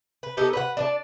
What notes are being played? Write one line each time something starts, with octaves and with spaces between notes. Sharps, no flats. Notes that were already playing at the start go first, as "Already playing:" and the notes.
B4
B3 D#4 G4 A4
B4 C#5 F#5
D4 D5 A5